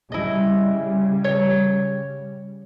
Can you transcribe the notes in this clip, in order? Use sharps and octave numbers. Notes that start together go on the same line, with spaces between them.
C#3 G3 E4 D#5
C#5